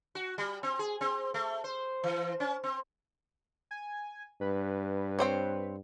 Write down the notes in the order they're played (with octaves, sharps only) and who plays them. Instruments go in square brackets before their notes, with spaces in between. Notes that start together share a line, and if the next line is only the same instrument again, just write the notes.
[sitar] F#4
G3
C4
G#4
C4
A3
C5
E3
C#4
C4
[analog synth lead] G#5
[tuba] G2 [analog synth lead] B4
[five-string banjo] C4 C5 C#5